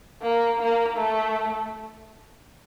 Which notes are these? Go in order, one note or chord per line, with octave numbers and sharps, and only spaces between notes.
A#3
A#3
A3